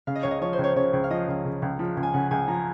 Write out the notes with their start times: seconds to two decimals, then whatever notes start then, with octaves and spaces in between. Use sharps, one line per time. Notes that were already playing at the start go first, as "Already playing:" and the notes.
0.07 C#3 F5
0.15 D#5
0.23 C#2 C#5
0.31 D#5
0.41 F3 C#5
0.53 C5
0.59 C#2 C#5
0.76 C#3 C#5
0.93 C#2
1.04 F5
1.10 F3 D#5
1.28 C#2
1.45 C#3
1.62 C#2
1.79 F3
1.97 C#2
2.03 G#5
2.14 C#3 F#5
2.31 C#2 G#5
2.48 F3 A#5